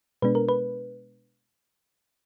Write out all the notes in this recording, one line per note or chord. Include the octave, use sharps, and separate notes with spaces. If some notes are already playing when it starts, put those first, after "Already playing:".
B2 G#3 B3 D4 B4
A#4
B4